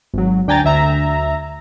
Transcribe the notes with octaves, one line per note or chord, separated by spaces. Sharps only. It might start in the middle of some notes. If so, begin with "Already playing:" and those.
G#1 F#3
D2 D4 G5 G#5 A#5 A6
D2 E5 A#5